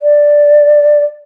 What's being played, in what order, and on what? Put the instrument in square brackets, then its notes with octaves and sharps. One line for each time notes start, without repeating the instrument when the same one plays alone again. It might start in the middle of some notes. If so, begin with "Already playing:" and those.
[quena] D5